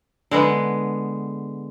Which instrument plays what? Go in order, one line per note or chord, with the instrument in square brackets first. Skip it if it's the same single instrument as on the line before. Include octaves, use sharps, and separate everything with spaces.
[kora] D3 G#3 B3